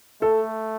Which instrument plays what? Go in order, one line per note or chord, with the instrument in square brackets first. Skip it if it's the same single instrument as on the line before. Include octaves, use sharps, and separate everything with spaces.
[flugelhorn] A3 [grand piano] A4